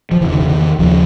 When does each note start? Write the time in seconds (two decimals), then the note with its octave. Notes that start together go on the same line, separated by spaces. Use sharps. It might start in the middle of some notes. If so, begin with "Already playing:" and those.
0.11 F3
0.20 E2 C#3 E3
0.30 D#3
0.40 D3
0.49 D#3
0.79 D#2 C#3 F3